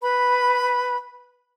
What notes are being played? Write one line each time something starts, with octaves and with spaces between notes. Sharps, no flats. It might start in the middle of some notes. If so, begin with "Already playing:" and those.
B4 B5